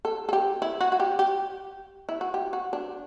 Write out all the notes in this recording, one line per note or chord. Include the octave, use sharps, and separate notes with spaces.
A4
A4
G4
E4
F#4
F#4
G4
G4
E4
F#4
G4
F#4
D4